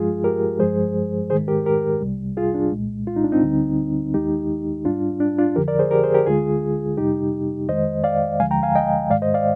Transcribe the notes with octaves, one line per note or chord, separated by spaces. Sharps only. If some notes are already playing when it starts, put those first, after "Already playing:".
Already playing: G2 F3 G#3 F4 G#4
G4 A#4
G2 F3 G#3 G#4 C5
G#2 D#3 G#3 G#4 C5
G4 A#4
G4 A#4
C2 C3 G3
F4 G#4
D4
C2 A#2 G#3
F4
D#4
D4
C4 D#4
D2 D3 G3
D#2 D#3 G#3 D#4 G4
G#2 G3 D4 F4
D4
D4 F4
F2 D3 F3 G4 A#4
A#4 D5
G#4 C5
G4 A#4
G#4 C5
G4 A#4
D2 D3 G#3 F4 G#4
F2 C3 G3 D#4 G4
F2 D#3 G#3 C5 D#5
D5 F5
D2 D3 F3 G#3 F5 G#5
G5 A#5
F5 G#5
D#5 G5
G#2 D#3 G#3 D5 F5
C5 D#5
D5 F5